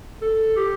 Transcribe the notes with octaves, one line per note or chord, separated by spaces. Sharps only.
A4
G4